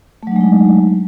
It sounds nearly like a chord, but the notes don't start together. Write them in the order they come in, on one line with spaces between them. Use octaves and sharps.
A3 F#3 D4 G#3 D#4